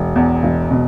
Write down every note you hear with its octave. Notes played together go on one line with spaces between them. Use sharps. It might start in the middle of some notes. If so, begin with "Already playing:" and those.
Already playing: E1
E2
E1
B2